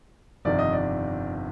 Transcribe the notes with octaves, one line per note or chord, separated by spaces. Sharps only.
G1 F2 C3 D#3 D5
D#5
D5